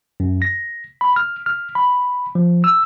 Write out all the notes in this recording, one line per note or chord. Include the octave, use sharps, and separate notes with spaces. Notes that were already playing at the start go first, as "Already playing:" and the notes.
F#2
A#6
B5
F6
F6
B5
F3
E6